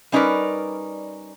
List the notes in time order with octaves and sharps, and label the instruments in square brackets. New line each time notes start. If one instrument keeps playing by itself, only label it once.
[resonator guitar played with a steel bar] G3 C#4 D#4 A#4 B4 D5